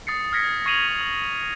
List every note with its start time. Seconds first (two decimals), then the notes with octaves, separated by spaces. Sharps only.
0.07 D#6 A6 C7 C#7
0.32 D#6 F6 G#6 A#6 B6 C#7
0.66 C#6 G#6 C7 D#7 F7 F#7
0.99 D#6 F#7